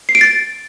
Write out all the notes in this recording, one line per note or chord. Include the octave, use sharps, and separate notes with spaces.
C7
D7
A6